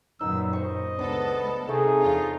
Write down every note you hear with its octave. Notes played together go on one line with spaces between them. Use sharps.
F#2 A#2 D#3 B3 D#4 E6
C5 D#5 C#6
C#2 G#3 B3 D4 A4
C3 A3 D#4 G#4
E2 D4 F4 F5